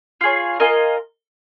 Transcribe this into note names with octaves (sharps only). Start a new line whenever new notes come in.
F4 G#4 C#5
F4 A#4 D#5 G#5